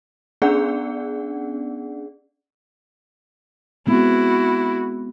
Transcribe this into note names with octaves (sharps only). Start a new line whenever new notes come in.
B3 C#4 D4 G#4 D5 F#5
G#3 B3 C4 E4 F#4